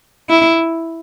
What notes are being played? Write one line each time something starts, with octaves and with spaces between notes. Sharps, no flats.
E4